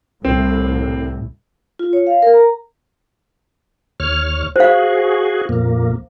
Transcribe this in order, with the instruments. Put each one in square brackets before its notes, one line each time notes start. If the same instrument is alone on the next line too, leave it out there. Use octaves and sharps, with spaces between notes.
[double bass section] C2 A2 [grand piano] C4
[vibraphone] F4
C#5
F5
A#4
A#5
[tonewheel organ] D#2 C#5 F6
[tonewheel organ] F#4 G#4 [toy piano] C5 F5
[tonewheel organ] F2 A#2 A#3